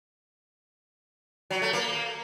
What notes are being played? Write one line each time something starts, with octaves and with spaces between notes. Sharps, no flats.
F#3
A3
A#3